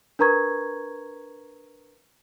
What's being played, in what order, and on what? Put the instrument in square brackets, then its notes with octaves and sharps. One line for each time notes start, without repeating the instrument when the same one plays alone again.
[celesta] D4 A#4 B4 A#5 C#6 G#6